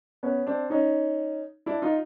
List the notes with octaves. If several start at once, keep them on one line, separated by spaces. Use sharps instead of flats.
B3 C#4
C4 D4
C#4 D#4
D4 E4
D#4 F4